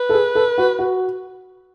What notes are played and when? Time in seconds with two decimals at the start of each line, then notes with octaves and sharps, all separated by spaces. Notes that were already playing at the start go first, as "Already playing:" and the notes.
Already playing: B4
0.09 A4
0.14 G#4
0.35 A4
0.58 F#4
0.79 F#4